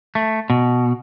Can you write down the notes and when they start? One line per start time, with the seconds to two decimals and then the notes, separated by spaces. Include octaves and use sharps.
0.15 A3
0.50 B2